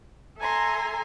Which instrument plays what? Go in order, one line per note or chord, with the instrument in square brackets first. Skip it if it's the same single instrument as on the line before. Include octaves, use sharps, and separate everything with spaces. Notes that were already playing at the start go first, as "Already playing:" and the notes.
[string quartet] A4 E5 G#5 A#5 C6